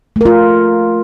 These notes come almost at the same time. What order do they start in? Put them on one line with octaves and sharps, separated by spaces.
A3 A#4 F4